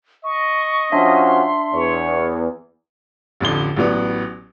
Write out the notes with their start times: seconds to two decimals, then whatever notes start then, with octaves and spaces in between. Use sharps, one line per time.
0.24 D#5 C#6
0.92 F3 C#4 D4 F#4 E5 C6
1.74 E2 C#5
3.40 A1 F2 D3 G7
3.76 A1 E3 F#3 B3 D5